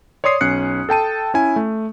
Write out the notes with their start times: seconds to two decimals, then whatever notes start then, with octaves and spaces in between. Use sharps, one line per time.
0.24 C#5 D5 C6 D#6 C7
0.41 B1 C#4 F#6 C#7
0.89 A4 G5 A5 D#7
1.34 C#4 E4 G#5
1.56 A3